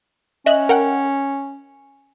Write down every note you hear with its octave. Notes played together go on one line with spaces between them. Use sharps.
C#4 D#5 E5 F#6
A#4 F#5 G5